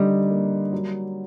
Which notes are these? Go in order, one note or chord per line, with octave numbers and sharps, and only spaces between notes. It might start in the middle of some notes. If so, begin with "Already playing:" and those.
Already playing: D3 G3 D#4
A#3
F#3